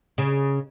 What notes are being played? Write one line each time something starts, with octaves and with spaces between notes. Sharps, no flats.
C#3